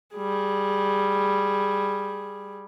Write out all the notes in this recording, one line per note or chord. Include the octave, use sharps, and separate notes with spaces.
G3 G#4